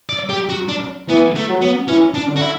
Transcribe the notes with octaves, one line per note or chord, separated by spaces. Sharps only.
D5
G4
F#4
D4
E3 B3
A3
F#3
B3
E3 C#4
D4
D3
F#4
E4